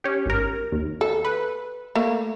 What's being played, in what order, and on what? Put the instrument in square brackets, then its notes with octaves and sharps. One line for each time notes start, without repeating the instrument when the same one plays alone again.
[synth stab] C#4 G4
G#1 A#4
D#2
[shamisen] A4
[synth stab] B4
[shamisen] A3 A#3